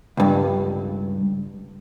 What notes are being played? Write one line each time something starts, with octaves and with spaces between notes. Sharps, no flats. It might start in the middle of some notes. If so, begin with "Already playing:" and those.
C#2 G2